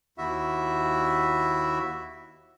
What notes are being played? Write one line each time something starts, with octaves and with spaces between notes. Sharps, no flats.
D#2 E4 F#4 E5